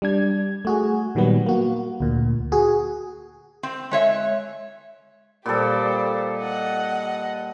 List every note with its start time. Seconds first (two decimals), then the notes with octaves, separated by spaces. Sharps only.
0.02 G3 D4 G#6
0.65 A3 F#4 G#4
1.15 A#2 D#3 F#3 G3 B3
1.46 A#3 F#4
2.00 D2 A#2
2.52 F#4 G#4
3.63 C4
3.91 G#3 C#5 E5
5.46 A#2 G3 G4 A4 C5
6.38 D#5 F#5